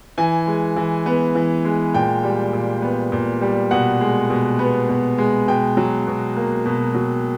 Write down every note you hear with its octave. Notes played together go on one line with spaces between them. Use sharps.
E3 G#5
G#3
E3
B3
E3
G#3
A#2 G5
G3
A#2
B3
A#2
G3
B2 F#5
G#3
B2
B3
B2
G#3
B2 G5
F#3
B2
A#3
B2
F#3